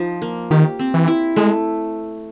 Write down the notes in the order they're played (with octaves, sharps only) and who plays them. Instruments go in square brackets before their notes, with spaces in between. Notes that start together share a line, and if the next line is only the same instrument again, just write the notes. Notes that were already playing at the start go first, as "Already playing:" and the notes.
Already playing: [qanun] F3 D#4
A#3
[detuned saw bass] D#3 [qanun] G4
[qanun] C4
[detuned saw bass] E3
[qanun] E4
[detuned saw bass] G#3 [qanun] A3